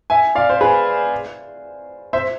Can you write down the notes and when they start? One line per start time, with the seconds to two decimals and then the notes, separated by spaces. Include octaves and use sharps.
0.10 E5 G#5
0.35 D5 F5
0.49 C5
0.61 G#4 B4
2.13 C5 E5